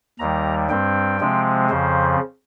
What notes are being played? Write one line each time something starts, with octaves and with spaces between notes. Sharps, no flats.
D#2 D#3 G3 A#5
G2 G3 C4 G5
C3 F3 G#3 C4
F2 C#3 F3 C5